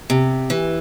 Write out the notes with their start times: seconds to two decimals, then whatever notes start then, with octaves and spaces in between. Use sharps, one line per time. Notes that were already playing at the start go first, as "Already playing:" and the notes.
0.10 C3
0.50 E3